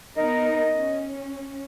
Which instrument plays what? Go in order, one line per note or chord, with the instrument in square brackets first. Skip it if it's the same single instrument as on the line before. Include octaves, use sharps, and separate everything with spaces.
[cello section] B3 D#4 A#4 [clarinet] D#5
[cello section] C#4